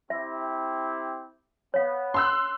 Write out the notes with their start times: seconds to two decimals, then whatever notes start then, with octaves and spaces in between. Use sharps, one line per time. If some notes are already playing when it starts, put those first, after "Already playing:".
0.10 C4 E4 G4 E5
1.74 B3 C#5 F5
2.14 C6 E6 F#6